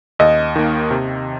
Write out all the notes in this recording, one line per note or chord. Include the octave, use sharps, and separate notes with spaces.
D#2 D#5
D#3 A#3
C3